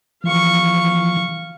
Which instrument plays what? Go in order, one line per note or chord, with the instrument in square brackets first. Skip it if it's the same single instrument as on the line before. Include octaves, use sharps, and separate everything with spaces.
[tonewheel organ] E3 F3 [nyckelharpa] F5 C#6